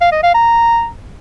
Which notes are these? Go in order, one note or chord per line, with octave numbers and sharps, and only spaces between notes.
F5
D#5
F5
A#5